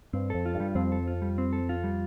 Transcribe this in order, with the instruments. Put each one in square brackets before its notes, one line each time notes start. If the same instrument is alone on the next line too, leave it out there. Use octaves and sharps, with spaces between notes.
[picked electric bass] G2 [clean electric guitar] C4
[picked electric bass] F2 [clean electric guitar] A4
[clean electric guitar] F4
[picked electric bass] G2
[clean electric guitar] G3
[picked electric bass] F2 F3 [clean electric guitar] C4
[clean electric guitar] A4
F4
G3
C4
A4
F4
G3